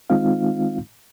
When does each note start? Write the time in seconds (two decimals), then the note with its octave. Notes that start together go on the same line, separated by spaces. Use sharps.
0.10 D#3 G#3 C4 D#4 F4 F5